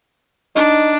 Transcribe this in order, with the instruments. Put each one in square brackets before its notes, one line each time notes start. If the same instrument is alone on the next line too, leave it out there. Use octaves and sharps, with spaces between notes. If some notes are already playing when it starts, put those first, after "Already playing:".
[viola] D4 [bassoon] D#4